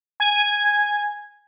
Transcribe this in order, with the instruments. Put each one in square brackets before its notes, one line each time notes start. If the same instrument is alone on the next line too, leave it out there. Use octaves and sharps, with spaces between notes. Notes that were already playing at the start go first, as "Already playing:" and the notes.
[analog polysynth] G#5 G#6